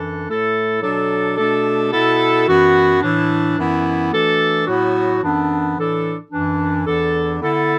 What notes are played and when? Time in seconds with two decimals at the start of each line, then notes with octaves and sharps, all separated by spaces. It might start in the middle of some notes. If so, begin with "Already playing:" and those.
Already playing: F#2 E3 D4 A4
0.28 A2 A3 E4 A4
0.83 B2 F#3 D4 A4
1.37 B2 A3 D4 A4
1.92 B2 B3 E4 A4
2.47 F#2 E3 B3 F#4
3.02 A2 E3 D4
3.57 F#2 E3 B3 E4
4.12 E3 A3 D4 F#4 A4
4.67 A2 F#3 B3 F#4
5.21 F#2 E3 B3 D4 A4
5.76 A2 E3 D4 A4
6.31 F#2 E3 D4
6.86 E2 E3 D4 A4
7.41 D3 B3 E4 A4